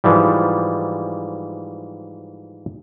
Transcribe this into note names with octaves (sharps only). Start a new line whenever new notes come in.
G#2 E3 F3 G3